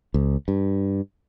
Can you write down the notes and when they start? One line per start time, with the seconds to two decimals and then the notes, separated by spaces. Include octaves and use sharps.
0.14 C#2
0.48 G2